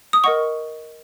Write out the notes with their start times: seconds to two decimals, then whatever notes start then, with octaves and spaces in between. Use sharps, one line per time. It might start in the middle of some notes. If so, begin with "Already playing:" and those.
0.13 D#6
0.24 A#4 D#5 F#5 C#6